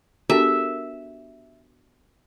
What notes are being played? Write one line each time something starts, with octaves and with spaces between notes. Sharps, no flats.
B3 D4 F#4 G4 A4 A#4 E5